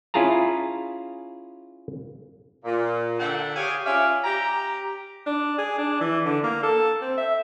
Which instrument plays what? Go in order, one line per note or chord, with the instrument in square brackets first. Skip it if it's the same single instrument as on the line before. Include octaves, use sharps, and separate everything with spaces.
[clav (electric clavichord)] C#4 E4 F4 G#4 A5 A#5
[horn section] A#2
D3 E5 F#5 G5 A5
G4 G#4 C#5 F5 G#5
C#4 F4 D5 E5 F5
G4 A#5
[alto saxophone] D4
G#4
D4
E3
D3
A#3
A4
C4
E5